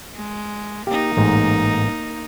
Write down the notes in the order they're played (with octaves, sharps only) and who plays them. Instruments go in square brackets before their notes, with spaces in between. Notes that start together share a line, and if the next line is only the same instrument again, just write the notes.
[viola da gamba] G#3
[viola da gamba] A#3 D#4 [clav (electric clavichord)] G4 F5
[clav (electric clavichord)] A1 G#2